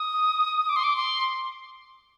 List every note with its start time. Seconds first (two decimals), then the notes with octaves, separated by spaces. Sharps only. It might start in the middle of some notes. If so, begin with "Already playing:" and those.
Already playing: D#6
0.69 D6
0.76 C6
0.84 D6
0.96 C6